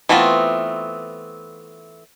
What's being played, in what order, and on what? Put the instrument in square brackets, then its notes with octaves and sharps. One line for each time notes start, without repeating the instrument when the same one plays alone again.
[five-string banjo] E3 A3 B3 C4 F4